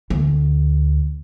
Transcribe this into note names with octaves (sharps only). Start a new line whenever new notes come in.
D2